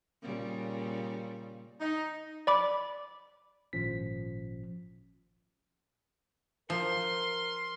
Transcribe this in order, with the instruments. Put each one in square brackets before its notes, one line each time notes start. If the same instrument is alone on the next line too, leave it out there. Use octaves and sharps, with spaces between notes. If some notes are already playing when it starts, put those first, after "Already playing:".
[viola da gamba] A#2 C#3 G3
[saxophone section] D#4
[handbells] D5 B5 D6
[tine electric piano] G#1 A#2 F3 C#4 B6
[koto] F3 [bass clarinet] A#4 [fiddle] C6